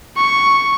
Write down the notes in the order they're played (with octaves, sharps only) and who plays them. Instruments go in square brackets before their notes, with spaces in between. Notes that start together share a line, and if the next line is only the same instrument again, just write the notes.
[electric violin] C#6